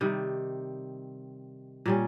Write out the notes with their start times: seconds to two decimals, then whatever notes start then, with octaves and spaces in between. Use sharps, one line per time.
0.01 C3 D#3 G3
1.86 A#2 G3 C#4